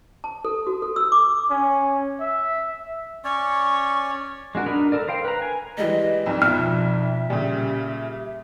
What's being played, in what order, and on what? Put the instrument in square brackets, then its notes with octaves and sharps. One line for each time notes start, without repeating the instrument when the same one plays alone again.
[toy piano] A5
A4
F#4
A4
E6
D6
[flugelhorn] C#4
E5
[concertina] C#4 C#5 D5 [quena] C#6
[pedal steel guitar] G#3 D4 F#4 A#4
D4 D#4 A#4 A#5 B5
A4 A#4 D5
A#4 C5 F5 G5
B4 A#5
G#5
[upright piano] E3 G3 G#3 [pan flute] D#5
[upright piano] C2 F2 G#2
[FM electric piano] B2 F3 [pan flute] E5 [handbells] F6
[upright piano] A#2 C#3 [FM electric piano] G3